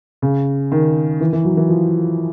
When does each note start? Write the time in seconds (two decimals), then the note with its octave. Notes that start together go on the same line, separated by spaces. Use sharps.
0.22 C#3
0.72 D#3
1.21 E3
1.33 E3
1.45 F#3
1.57 E3
1.70 F3